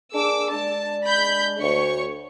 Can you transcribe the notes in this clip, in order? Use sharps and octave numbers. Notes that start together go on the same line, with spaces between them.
A#3 D4 G#4 D6 E6
G#3 D4 A5
B5 G6
D2 C#5 C#6